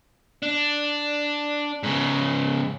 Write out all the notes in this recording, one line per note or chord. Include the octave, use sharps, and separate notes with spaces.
D4
G#2 C#3